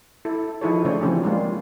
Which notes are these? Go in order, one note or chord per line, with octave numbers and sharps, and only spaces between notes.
E4 A4
F3 D#4 E4 G#4 A4 C#5
C#3 A3 D4 C5 C#5
E3 F3 C4 C#4 G4 G#4
G3 G#3 A#3 F4